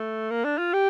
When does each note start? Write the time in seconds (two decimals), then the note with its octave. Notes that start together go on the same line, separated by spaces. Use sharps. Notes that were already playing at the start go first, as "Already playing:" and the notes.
Already playing: A3
0.30 A#3
0.44 D4
0.58 F4
0.73 G4